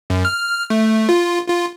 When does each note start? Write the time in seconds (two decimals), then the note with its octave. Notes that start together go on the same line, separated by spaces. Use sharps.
0.10 F#2
0.25 F6
0.70 A3
1.09 F4
1.48 F4